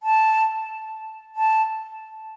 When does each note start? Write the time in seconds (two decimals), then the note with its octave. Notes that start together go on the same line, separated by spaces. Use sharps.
0.03 A5
1.36 A5